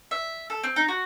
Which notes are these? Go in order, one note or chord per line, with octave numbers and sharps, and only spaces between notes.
E5
A4
C4
D#4
F#4